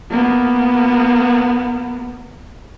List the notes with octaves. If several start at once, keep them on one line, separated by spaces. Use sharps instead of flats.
A#3 B3